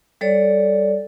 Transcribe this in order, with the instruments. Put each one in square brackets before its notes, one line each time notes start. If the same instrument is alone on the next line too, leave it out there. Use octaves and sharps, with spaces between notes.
[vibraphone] G3 A4 C#5 D5